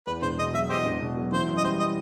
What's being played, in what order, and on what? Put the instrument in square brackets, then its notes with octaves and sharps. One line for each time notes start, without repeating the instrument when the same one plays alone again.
[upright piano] E2 [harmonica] B4
[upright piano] E1 [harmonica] C5
[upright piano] B2 [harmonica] D#5
[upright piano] F#3 [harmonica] E5
[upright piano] E2 [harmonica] G4 C5 D#5
[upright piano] E1
B2
F#3
[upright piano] E3 [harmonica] C5
[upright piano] F#2
[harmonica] D#5
[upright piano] G3 [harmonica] C5
[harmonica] D#5